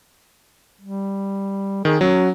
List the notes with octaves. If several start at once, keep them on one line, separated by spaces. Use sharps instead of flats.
G3
D#3 G#4
F#3 C#4